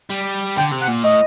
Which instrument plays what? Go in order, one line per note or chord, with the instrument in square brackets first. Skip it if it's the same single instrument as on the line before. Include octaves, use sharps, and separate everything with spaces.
[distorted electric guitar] G3
[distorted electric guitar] D3 [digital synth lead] G5
[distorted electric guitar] C3
[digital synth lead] F#5
[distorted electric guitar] A#2
[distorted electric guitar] A2 [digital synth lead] D#5